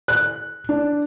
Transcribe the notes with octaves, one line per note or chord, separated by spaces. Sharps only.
F#6
D4